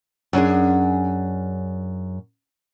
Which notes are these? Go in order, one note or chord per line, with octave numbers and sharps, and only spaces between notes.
F#2 C#4 D4 G#4